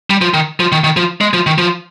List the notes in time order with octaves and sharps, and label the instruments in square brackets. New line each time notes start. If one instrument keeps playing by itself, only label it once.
[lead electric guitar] G3
F3
D#3
F3
D#3
D#3
F3
G#3
F3
D#3
F3